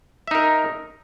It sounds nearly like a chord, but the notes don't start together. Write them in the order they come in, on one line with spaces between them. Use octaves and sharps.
E5 D#4 A#4